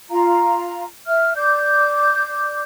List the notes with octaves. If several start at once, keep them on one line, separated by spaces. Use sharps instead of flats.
F4 F5 A#5
E5 F6
D5 D6 G6